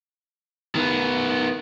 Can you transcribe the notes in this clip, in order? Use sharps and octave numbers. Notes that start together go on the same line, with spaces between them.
D#3 B3